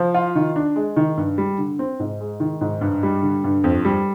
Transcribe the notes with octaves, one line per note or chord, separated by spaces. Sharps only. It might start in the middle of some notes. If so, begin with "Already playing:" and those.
Already playing: F3
F4
D#3
D4
G#3
D#3
G2
G3
D3
C4
G#2
G#3
D#3
G#2
G2
G3
D3
G2
F2
G3